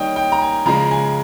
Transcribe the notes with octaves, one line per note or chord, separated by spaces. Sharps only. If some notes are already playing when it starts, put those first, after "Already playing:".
Already playing: D#3 G3 A#3 C#5 D#5 G5
G5
A#5
G#5
C#3 F3 G#3 A#5
G#5